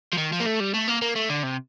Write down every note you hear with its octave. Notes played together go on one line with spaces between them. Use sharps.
F3
D#3
F3
A#3
A3
G3
A3
A#3
A#3
A3
D3
C3